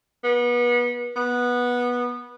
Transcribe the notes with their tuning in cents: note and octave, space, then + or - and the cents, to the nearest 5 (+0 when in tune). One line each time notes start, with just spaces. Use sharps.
B3 -30
B3 -15